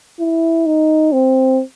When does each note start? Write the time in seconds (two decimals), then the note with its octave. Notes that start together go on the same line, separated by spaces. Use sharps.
0.20 E4
0.67 D#4
1.13 C4